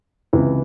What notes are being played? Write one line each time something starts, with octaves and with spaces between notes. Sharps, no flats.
C#2 C3 E3